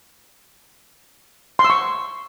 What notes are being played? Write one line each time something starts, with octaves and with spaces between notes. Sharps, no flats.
C6
E6
C#6